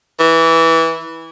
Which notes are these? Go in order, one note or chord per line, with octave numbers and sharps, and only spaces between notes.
E3